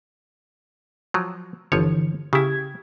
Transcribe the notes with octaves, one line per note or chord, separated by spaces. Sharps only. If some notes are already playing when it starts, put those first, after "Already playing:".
F3 F#3
G1 D3 E3 F3 C#5
C#3 E4 G4 G#6